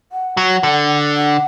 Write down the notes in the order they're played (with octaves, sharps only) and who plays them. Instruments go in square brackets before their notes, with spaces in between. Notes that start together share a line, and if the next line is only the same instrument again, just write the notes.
[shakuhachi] F#5
[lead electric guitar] F#3
D3
[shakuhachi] F#5